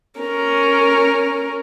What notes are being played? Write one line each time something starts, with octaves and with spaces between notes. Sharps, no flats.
C#4 A#4